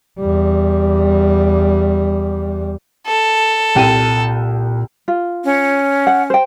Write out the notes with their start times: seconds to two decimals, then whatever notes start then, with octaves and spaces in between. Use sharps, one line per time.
0.20 E2 G3
3.07 A4
3.75 C2 A#2 G5 D#7
5.08 F4
5.44 C#4
6.07 F#5
6.30 C5 G5